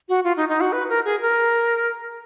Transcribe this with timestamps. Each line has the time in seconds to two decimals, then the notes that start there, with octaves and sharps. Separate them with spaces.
0.09 F#4
0.24 F4
0.36 D#4
0.49 D#4
0.61 F#4
0.72 B4
0.89 A#4
1.05 G#4
1.22 A#4